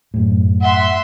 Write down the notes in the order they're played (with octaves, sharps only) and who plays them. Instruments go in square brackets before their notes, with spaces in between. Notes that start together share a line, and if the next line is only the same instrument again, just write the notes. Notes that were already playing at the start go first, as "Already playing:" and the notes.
[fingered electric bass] F#2 A2
[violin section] E5 C6 [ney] F#5